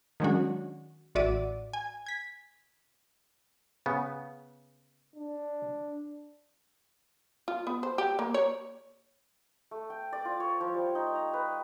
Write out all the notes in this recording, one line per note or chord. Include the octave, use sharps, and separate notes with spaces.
D#3 F#3 G#3 C#4 D4 F#4
A1 F#4 D5 E5 D#7
G#5
G#6 B6
C#3 B3
D4
F4
B3
C5
G4
A#3
C#5
A3
G5
D5
F4
C#5
F3
G3
D#4
A#5
B4